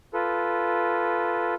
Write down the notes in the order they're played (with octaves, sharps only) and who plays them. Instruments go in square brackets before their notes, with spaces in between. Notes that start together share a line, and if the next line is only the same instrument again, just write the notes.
[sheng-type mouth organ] F4 A4 B4